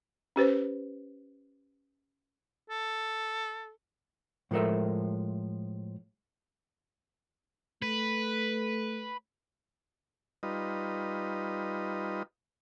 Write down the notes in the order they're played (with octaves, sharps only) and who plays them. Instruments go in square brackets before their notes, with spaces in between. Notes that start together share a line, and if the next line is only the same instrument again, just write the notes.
[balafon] C#4 G4 B4 C5
[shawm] A4
[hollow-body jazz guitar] A2 F3 G#3 A4 A#4 E5
[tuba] A3 [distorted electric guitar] B4
[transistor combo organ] G3 D#4 F4 B4 D#5